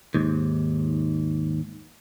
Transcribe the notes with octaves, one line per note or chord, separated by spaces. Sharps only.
D#2 G#2